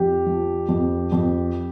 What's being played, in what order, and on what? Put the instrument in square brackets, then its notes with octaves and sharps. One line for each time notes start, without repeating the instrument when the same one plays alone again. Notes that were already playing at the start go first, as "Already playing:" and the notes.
Already playing: [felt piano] F2 [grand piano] G4
[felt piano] F3
F2
F2